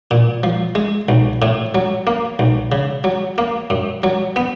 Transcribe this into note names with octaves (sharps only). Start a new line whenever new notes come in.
A#2
F3
G#3
B1
A2
F#3
A#3
B1
C#3
F#3
A#3
F#2
F#3
B3